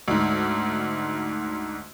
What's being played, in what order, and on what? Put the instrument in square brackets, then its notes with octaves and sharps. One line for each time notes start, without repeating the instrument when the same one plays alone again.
[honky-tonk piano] D2 G#2